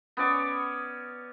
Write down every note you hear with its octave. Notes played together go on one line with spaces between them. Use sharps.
B3 C#4 D5 C#6